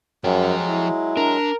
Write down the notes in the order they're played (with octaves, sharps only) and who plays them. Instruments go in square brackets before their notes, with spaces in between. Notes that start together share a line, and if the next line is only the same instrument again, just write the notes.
[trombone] F#2 [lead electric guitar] F3 G5 [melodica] F#3 G#3
[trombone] E4
[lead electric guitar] D4 [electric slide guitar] A#4